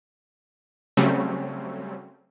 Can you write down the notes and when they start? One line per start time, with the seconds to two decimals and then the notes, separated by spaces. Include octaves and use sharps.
0.97 C#3 F#3 G3 A3 C4 C#4